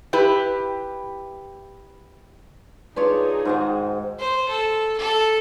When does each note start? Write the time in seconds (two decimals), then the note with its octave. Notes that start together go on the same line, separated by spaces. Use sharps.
0.13 E4 G4 B4
2.97 D4 D#4 F4 G#4 B4 C#5
3.45 G#2 D#3 F#4 C5
4.20 C5
4.49 A4
4.98 A4